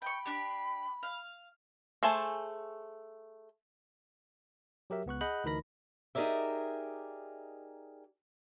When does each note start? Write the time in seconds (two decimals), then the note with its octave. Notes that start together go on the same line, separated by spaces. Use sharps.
0.02 G5 B5 C#6
0.26 D4 G4
1.03 F5
2.03 A3 G#4 C5 G#5 A5
4.90 F#3 G4 A#4 E5
5.06 C#2 B3 C#6 F#6
5.21 G#4 D#5 F#5 B5 F#6 G6
5.44 D2 E3 D#4 A#4 B5 A#6
6.15 D#4 G4 G#4 A#4 D5 E5